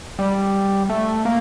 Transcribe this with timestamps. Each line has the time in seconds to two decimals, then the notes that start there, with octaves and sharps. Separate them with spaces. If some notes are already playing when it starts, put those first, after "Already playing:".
0.19 G3
0.89 A3
1.25 A#3